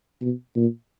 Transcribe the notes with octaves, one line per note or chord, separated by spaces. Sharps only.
B2
A#2